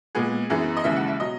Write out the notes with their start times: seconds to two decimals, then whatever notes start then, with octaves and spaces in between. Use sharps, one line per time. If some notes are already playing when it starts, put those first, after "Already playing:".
0.15 A#2 G#3 B3 G#4
0.50 F#2 E3 B3 G#4
0.77 D#5
0.84 D#2 C#3 E3 G#3 E5
0.96 F#5
1.08 E5
1.20 B2 F#3 D#5